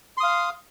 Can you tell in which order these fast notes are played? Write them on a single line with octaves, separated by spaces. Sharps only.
C6 D#6 F5